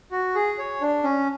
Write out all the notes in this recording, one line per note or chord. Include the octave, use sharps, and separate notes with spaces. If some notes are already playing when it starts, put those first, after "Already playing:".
F#4
G#4
C#5
D4
C#4